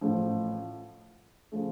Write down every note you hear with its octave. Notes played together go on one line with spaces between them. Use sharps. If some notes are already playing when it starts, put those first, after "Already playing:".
A1 A2 F3
C#3 F3 A3